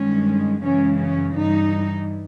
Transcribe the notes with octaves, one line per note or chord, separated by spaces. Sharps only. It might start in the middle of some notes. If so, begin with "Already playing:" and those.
Already playing: G2 D#3 G#3 C#4
F#2 C#3 E3 G#3 C#4
C#4
G2 E3 G3 D#4